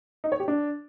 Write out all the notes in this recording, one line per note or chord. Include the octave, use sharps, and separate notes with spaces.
D#4
C#5
G4
D4